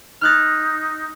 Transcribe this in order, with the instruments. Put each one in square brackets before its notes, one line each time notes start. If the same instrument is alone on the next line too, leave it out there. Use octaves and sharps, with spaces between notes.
[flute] D#4 [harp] F6 F#6 A6